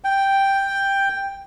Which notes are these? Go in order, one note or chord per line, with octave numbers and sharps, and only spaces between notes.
G5